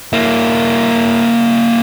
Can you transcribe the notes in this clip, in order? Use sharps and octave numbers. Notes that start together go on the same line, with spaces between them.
A#3 E4